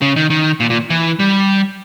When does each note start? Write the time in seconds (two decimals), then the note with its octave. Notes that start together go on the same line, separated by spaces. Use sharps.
0.02 C#3
0.16 D#3
0.30 D#3
0.60 A#2
0.70 A#2
0.90 E3
1.19 G3